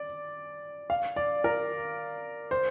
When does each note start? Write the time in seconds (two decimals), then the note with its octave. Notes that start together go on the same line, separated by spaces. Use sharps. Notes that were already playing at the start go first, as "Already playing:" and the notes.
Already playing: D5
0.90 F5
1.16 D5
1.44 A#4
2.51 C5